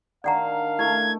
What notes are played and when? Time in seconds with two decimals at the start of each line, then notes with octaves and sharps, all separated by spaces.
0.24 D#3 D4 D5 F5 F#5 A#5
0.79 A3 E4 G#6